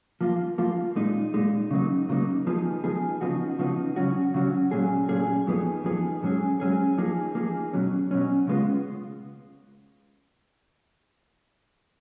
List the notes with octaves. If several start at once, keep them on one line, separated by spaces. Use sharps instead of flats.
F3 A#3 F4
F3 A#3 F4
A#2 G#3 D#4
A#2 G#3 D#4
C#3 F#3 A#3 D#4
C#3 F#3 A#3 D#4
F3 B3 D#4 G#4
F3 B3 D#4 G#4
C#3 F3 B3 D#4 F#4
C#3 F3 B3 D#4 F#4
C#3 F#3 C#4 F#4
C#3 F#3 C#4 F#4
A#2 F#3 C#4 G#4
A#2 F#3 C#4 G#4
F2 F3 B3 D#4 G#4
F2 F3 B3 D#4 G#4
G#2 F#3 C#4 G#4
G#2 F#3 C#4 G#4
F3 A#3 D#4 G#4
F3 A#3 D#4 G#4
B2 F#3 C#4
B2 F#3 C#4
C#3 G#3 B3 F4